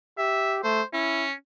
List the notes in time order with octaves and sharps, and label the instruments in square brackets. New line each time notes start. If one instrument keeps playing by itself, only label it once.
[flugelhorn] G4 [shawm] E5
[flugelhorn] A3 [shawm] C5
[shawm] C#4 [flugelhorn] E4